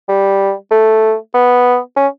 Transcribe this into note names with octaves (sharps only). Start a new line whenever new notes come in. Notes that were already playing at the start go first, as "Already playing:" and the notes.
G3
A3
B3
C#4